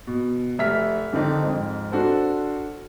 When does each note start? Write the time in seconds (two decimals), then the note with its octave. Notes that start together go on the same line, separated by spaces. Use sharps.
0.07 B2
0.59 F1 E5 F6 B6
1.13 F2 D3 D#3 C4 D4 D#4
1.43 F2 G#2
1.92 D4 F#4 A4 C5